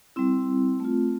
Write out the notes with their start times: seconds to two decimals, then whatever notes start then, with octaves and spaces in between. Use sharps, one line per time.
0.16 G3 C4 E4
0.80 A3 C4 F4